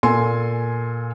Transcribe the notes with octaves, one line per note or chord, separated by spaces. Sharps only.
A#2 A4 G#5 C6